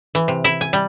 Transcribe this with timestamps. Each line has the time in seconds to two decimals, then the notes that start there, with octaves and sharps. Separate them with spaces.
0.15 E3
0.28 C3
0.44 E4
0.61 G#5
0.73 G3